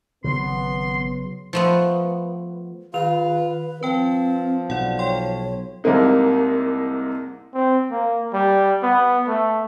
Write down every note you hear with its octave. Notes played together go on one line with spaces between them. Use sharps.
G#1 C#3 F#3 B3 C6
F3 A3 B3
D#3 F4 B4 F7
F3 C4 B4 G5
B1 D5 F#5
C#5 G5 C6
C2 C3 G#3 A#3 D#4
C4
A#3
G3
B3
A3